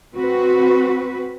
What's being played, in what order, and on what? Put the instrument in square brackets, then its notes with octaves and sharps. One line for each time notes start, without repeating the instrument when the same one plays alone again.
[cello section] C4 F#4 B4